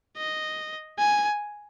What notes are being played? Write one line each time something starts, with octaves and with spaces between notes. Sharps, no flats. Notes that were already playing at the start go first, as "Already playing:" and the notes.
D#5
G#5